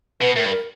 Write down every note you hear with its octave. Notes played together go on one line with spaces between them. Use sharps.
B2 B4
A2 A#4
G2
A#4